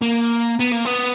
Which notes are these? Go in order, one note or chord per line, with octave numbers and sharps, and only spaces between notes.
A#3
B3
A#3
B3